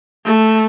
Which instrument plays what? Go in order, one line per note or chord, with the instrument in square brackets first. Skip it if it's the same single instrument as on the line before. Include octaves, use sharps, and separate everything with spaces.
[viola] A3